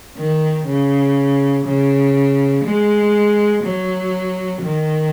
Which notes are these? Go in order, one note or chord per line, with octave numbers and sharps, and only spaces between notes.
D#3
C#3
C#3
G#3
F#3
D#3